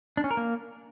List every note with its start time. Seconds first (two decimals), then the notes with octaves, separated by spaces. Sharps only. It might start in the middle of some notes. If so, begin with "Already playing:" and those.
0.17 D4
0.24 C#4
0.31 A#4
0.37 A#3